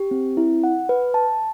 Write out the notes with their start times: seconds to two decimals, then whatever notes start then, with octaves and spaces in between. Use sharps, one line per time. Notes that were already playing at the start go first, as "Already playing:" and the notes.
Already playing: G4
0.11 C4
0.37 E4
0.64 F#5
0.89 B4
1.14 A5